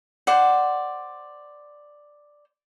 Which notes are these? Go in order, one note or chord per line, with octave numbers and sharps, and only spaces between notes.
C5 D5 F#5